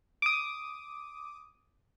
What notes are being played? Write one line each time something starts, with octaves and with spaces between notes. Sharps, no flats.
D6 D#6